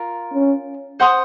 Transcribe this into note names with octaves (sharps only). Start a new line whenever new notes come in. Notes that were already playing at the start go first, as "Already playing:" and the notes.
Already playing: F4 A#4
C#4
C5 F#5 C6 D#6